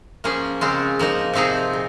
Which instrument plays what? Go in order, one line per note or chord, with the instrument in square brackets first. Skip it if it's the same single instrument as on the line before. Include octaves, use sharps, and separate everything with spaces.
[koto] F3 A#3 C#4 G#4
C#3 G#3 C4 F4
F3 A#3 D#4
C3 F3 C4 D#4 G#4
A#2